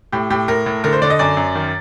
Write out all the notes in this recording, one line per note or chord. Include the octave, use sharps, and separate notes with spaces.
A2 G4
A2 G4
A2 A#4
A2
D3 A#4
C5
D3 D5
D#5
F#2 D5
F#2
D#3